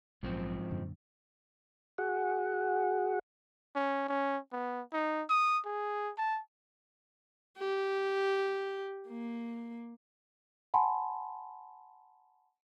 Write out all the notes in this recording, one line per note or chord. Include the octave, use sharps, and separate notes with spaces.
A#1 G#2 F3 F#3 C4
F#2 A#2 D3
F#4 G#4 F#5
C#4
C#4
B3
D#4
D#6
G#4
A5
G4
A#3
F#5 G#5 A5 B5 C6